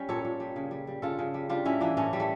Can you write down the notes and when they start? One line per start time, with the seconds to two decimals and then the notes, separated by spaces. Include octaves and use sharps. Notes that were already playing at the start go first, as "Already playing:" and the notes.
Already playing: G3 C#4
0.09 A#2 A4 C#5
0.25 A#2
0.40 G3
0.56 C#3
0.71 G3
0.87 G3
1.02 C#3 F4 A4
1.19 C#3
1.34 G3
1.49 G3 D4 F4
1.65 A2 C#4 E4
1.80 E3 A#3 D4
1.97 A2 A3 C#4
2.13 G3
2.20 A3